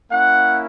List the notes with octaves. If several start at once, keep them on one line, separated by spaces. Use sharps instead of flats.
A#3 C#4 E4 F#5